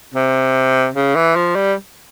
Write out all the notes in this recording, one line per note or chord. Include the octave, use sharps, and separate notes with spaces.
C3
C#3
E3
F3
G3